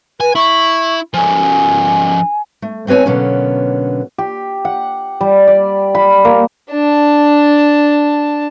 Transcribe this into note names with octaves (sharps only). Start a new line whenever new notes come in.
B4 G#5
E4 C#6
F3 C#4 G#5
A3
A3 C4 B4 C#5 G#5
B2 D3 F#3 A#3 B3 C#4
G4
F#5
G3
D5
B5
A#3
D4 A5